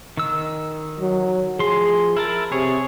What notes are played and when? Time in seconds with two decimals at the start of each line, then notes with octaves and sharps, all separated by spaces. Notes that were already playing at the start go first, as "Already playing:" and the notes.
0.17 D#3 E6
1.00 F#3
1.59 F3 G#4 C6
2.17 E4 A#4 A5
2.52 C3 G#4 C#5